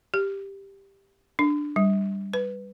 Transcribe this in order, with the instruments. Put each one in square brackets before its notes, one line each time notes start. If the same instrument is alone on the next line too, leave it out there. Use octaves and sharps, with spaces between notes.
[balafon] G4
D4
G3
B4